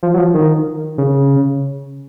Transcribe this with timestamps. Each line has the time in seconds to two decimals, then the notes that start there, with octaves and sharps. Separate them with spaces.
0.03 F3
0.14 F#3
0.18 F3
0.34 D#3
0.98 C#3